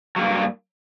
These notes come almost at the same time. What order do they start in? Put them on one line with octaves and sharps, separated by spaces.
F#3 A#3 G2